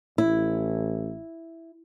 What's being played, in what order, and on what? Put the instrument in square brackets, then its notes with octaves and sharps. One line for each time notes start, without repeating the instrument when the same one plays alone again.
[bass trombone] A1 [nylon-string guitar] E4